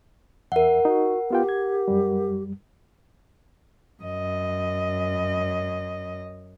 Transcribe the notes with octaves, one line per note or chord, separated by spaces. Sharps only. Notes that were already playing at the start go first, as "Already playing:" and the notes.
E2 A#4 E5 F#5
D#4 F#4
B3 F4 G4 G5
G#6
F#2 G3
F#2 D#5